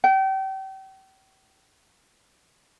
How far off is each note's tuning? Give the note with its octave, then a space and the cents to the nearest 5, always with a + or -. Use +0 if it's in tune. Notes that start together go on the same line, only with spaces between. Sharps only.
G5 -35